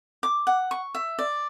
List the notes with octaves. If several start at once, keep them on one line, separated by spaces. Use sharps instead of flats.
D6
F#5
C#6
E5
D5